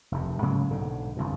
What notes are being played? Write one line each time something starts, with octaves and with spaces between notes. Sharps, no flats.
F1 D#2
G#2 C#3 F#3 A#3
B1 G#2 D3
G1 C2 F#2